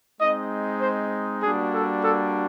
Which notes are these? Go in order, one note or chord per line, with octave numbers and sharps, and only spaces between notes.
G#3 C4 D#4 D#5
C5
G3 A#3 D4 F#4 G#4
A4
A4